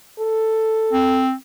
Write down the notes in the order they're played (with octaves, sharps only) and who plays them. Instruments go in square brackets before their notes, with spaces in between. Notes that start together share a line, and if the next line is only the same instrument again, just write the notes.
[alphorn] A4
[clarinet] C4